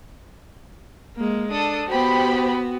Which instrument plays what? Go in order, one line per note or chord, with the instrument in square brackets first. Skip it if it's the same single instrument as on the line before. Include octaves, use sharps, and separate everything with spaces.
[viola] G#3 A#3
[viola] D4 [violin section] A4 D#6
[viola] B3 F#4 [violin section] G4 C5 B5